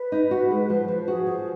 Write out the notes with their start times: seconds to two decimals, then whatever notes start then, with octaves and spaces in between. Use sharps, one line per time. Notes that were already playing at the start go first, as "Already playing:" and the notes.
Already playing: B4
0.12 D#4
0.31 F#4
0.51 G#3
0.70 F3
0.88 F3
1.08 F#4 G#4
1.27 F3